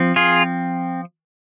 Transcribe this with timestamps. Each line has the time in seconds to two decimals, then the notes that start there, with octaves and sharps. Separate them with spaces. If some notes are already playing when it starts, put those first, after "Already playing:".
Already playing: F3 C4
0.16 F4 G#4